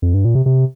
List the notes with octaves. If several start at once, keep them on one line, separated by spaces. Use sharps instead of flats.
F2
G2
A#2
C3
C3